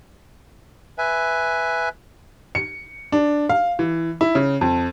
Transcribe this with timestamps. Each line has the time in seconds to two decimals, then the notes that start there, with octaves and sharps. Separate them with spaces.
0.98 B4 E5 G#5
2.55 C#7
3.12 D4
3.49 F5
3.79 E3
4.21 E4
4.35 C#3
4.61 F2